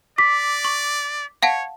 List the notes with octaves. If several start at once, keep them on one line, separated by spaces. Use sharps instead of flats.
D5 D6 B6
C#6
C#5 F5 F#5 A5